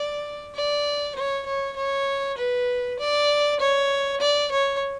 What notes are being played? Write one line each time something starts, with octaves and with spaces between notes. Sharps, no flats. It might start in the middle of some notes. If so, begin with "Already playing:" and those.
Already playing: D5
D5
C#5
C#5
C#5
B4
D5
C#5
D5
C#5